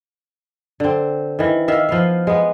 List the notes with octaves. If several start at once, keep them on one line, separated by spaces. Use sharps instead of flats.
D3 C4
D#3 E3
D#3 E5 F5
F3 B3 F5
G#3 B3